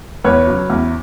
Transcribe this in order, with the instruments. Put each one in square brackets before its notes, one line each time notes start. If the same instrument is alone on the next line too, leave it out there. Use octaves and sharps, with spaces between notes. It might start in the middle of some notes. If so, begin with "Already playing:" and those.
[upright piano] E2 B4 C#5
C#3 F#3
E2